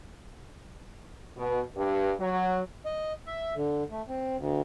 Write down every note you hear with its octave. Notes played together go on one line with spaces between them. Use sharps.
B2
G2
F#3
D#5
E5
D3
A3
C4
D2